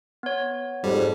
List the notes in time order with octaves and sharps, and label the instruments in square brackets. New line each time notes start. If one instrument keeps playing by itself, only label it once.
[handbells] B3 C#5
[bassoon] F2 [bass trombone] G#2 [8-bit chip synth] G3